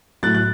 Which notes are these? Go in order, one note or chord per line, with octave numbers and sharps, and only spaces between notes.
A2 F#3 F#6 A6
F#6